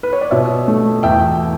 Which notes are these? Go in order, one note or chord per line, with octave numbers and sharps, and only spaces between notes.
B4
C#5
D5
B2 C#5 E5
A3
E2 E5 G5